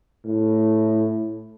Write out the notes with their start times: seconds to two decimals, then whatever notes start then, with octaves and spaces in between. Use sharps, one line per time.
0.25 A2